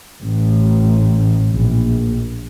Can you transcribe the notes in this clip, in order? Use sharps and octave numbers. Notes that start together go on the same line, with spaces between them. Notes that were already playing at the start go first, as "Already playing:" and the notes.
A1
A#1